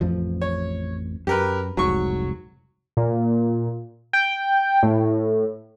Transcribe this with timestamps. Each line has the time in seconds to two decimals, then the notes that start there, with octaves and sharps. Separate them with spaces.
0.01 A1 F2 F3
0.42 C#5
1.27 F#2 G4 A#4 B4
1.77 F1 C2 G#2 F#3 C#6
2.97 A#2
4.13 G5
4.83 A2